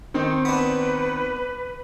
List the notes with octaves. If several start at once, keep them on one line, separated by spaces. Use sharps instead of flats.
D#3 C4 D#4
B3 D4 B4